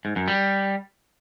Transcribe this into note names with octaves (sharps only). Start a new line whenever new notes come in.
G#2
F#2
G3